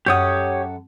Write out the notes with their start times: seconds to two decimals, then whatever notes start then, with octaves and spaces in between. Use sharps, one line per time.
0.06 F#2 G4 A4 C#5 F#5 D#6